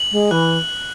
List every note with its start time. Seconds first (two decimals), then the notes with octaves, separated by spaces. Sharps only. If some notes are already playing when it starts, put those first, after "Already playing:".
Already playing: F#7
0.12 G#3
0.31 E3 F#6